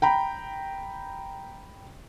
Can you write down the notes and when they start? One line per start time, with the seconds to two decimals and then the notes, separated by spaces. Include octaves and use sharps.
0.02 G5 A#5 B5